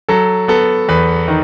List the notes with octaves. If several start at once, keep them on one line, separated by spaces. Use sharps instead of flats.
F#3 A4
B3 A4
E2 B4
D#3